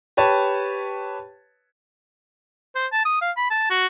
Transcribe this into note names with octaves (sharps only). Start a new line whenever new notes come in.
G4 B4 C#5 A5
C5
A5
D#6
F5
B5
A5
F#4